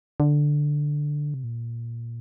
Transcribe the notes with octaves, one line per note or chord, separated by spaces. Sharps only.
D3
C3
A#2